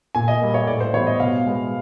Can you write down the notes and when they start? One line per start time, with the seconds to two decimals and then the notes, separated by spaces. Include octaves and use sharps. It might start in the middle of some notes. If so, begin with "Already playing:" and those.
0.15 A#2 G#5
0.28 D#5
0.41 G3 A#3
0.54 C#5
0.67 A2 D5
0.81 C5
0.94 E3 G3 B3 C#5
1.07 D#5
1.20 B2 F5
1.47 G#3 B3